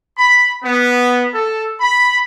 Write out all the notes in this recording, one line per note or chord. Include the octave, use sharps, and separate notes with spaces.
B5
B3
A4
B5